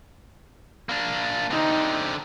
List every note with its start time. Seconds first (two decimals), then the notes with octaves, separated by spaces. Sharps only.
0.89 A#3 D4
1.51 D3 C4 D#4